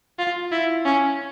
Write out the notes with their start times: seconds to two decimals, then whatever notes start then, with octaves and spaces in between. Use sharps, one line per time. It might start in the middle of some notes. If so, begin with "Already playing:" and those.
0.19 F4
0.52 E4
0.85 C#4